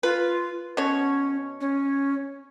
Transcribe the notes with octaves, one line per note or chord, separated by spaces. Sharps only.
F4 B4
B2 C#4 C#5
C#4